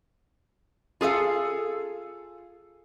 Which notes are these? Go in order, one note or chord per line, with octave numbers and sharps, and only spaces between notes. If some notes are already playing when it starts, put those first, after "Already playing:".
F4 G#4 A4 F5